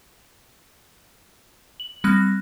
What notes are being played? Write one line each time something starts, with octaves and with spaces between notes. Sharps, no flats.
F#7
G3 C4 F#6 A#6